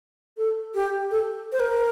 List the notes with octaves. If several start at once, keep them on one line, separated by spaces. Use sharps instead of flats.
A4
G4
A4
C5
A#4